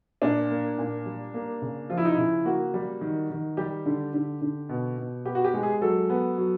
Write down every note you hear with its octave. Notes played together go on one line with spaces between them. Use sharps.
A#2 D4
A#3
A#2
G3
A#3
C#3
F3 F4
E4
D#4
E4
C#3
A#3 F#4
G3
D#3
D#3
G3 G4
D3
D3
D3
B2
B2
B3 G4
F#4
G4
G#3
G#4
F#3 A4
B3
F#3